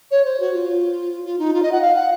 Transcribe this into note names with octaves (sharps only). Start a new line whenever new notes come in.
C#5
C5
F#4
F4
F4
D#4
F4
D#5
F#5
F5
F#5